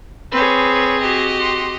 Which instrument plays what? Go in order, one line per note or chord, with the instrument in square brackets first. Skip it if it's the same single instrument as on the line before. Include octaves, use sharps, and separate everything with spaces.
[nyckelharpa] C4 G#4 [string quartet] B4 C#5
[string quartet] F#4 G4 D#5
[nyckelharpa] C6